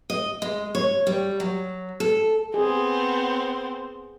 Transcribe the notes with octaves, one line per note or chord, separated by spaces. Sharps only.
D#5
G#3
C#5
G3
F#3
A4
B3 C4 G#4